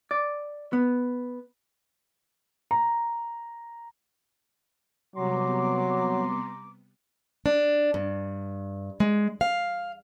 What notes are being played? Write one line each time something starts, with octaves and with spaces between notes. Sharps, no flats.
D5
B3
A#5
C3 F#3 G3 B3 A#5 C6 D6
D4
G2
G#3
F5